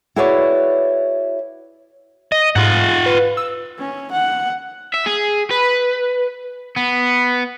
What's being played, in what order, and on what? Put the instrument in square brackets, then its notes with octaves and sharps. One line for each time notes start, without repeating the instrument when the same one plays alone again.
[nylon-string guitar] E4 F#4 G#4 B4 C#5 D5
[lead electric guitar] D#5
[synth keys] G#2 [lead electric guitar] F4 F#5
[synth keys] B4
E6
[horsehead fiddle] C#4
F#5
[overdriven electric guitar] E5
G#4
B4
B3